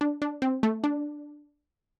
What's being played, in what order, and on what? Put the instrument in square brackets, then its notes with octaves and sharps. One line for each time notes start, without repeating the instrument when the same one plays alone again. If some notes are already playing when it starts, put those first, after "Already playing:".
[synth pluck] D4
D4
C4
A3
D4